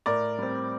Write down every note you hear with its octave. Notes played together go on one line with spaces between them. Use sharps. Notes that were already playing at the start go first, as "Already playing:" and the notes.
A2 A#4 D5
G3 C4